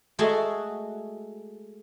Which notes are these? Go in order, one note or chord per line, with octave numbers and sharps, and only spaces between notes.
G#3 A3 F#4 G#4 A4 E5